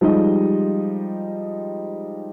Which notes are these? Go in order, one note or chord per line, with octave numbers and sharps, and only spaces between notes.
F3 G3 G#3 D#4 G4 D#5